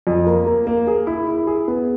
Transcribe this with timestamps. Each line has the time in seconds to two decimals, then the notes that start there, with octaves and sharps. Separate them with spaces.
0.07 F2
0.26 A#3
0.46 A#3
0.67 A#3
0.87 G#4
1.07 E4
1.27 E4
1.47 G#4
1.68 B3